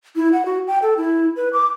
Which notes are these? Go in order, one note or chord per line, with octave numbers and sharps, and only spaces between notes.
E4
F#5
F#4
G5
A4
E4
B4
D6